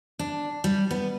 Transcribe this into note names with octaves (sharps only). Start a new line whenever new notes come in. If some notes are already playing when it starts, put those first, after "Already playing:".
D4
G3
B3